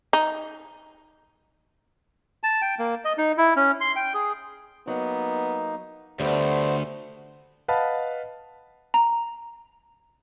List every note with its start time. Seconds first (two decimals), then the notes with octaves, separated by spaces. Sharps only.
0.13 D#4
2.43 A5
2.62 G5
2.79 A#3
3.05 D#5
3.18 D#4
3.38 E4
3.56 C#4
3.81 C6
3.96 G5
4.14 G#4
4.87 F#3 A#3 B3 D#4
6.20 D2 G3 A3 B3 C5
7.68 B4 D#5 F5 F#5 A5 B5
8.94 A#5